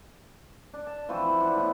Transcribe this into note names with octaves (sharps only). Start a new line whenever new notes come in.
D4
A5
E3 F3 C4 F#4
D4 F#5
A2 B3